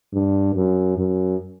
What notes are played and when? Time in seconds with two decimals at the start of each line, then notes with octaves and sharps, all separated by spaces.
0.13 G2
0.55 F#2
0.98 F#2